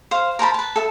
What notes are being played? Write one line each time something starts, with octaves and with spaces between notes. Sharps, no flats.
C5 F5
A#4 C5 A5 B5
B4 A5
A4 E5